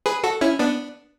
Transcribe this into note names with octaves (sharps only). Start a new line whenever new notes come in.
G#4 B4
F#4 A4
C#4 E4
B3 D4